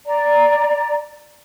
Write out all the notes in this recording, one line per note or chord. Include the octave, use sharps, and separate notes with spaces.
D5 A#5